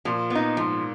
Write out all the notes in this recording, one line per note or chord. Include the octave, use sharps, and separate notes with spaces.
A#2 F3
B3
D#4
G#2 F3